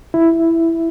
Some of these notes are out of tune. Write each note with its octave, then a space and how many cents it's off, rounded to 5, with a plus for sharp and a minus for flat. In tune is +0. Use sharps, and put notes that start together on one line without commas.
E4 +5